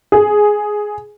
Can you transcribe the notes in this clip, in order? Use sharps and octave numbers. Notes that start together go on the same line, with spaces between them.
G#4